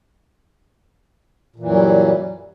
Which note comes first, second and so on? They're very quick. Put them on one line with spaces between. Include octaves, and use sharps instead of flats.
A#2 E3 F#2 F#3 G3